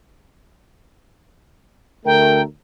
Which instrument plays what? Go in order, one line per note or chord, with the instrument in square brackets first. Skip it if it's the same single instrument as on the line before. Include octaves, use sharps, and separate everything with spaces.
[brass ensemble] D2 A3 A#4 [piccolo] G5